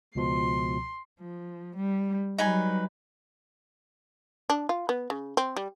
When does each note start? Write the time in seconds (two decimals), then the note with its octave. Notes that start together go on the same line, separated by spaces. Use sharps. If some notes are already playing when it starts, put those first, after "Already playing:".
0.15 C#2 B2 F3 C6
1.20 F3
1.76 G3
2.38 F#3 G3 D#4 B4 G#5
4.50 D4
4.69 F4
4.89 B3
5.10 C#3
5.37 C4
5.56 G3